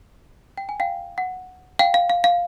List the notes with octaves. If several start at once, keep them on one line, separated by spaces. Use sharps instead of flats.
G5
G#5
F5 G5
F#5
F5 G5
F5
F5
F5